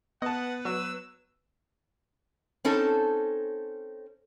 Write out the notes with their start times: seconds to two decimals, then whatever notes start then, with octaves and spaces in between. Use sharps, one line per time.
0.22 B3 B4 D#5 F#5 A5
0.65 F#3 E6
2.65 C4 C#4 D#4 A4